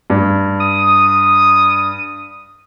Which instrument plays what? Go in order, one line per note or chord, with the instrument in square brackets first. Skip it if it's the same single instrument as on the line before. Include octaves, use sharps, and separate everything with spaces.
[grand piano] G2
[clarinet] D#6